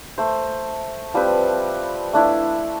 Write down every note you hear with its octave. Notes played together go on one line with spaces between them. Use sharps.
A3 C5
F3 G3 C4 B4
A3 D4 E4